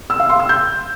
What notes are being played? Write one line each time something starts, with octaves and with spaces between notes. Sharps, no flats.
E6
F5
C6
E6
G6